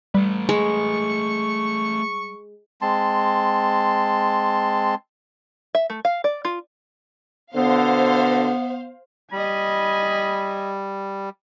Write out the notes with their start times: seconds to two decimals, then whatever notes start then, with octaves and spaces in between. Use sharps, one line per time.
0.15 G3 A3 B4
0.49 G#3 C#6
2.81 G#3 C4 A5 C6
5.75 E5
5.90 A3
6.05 F5
6.24 D5
6.45 F4
7.54 B2 D3 B3 C5 F5
9.32 G3 D#5 G#5 B5